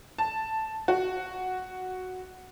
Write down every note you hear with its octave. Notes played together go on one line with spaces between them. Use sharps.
A5
F#4